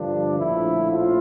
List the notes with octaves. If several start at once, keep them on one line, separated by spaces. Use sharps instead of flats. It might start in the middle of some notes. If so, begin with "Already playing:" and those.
Already playing: G2 D3 F3 D4
A#1 A2 F3 A3 E4
F4